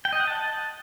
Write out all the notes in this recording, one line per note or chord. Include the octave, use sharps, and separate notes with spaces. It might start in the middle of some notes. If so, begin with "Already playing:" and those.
G5
D#5
F#5
A5